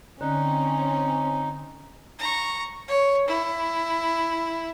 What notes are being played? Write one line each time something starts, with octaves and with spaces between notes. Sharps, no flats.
D3 C4 C#4 D#4
A#5 C#6
C#5
E4